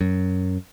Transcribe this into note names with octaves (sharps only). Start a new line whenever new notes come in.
F#2